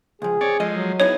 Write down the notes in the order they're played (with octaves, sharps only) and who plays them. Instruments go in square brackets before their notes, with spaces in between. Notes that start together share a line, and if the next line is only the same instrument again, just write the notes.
[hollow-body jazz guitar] C#2 F3 [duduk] G#4
[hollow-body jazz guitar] C4 [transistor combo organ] C#5 D5
[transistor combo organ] F3 G#3 [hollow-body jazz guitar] A4 D#5
[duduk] F#3
[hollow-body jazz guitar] B3 D#4 E4 [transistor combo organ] G#4 [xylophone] C#5